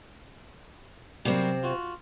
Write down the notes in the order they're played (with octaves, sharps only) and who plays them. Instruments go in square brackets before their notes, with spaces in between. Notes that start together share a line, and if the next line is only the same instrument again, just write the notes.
[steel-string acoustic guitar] C3 C4 [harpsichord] F#3 G3 A#3
[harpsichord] F4 F#4